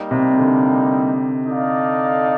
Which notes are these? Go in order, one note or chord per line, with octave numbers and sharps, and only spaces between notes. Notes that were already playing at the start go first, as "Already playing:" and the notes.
Already playing: G3 A#3 D#4
C3
D3
D#4 A4 D5 F5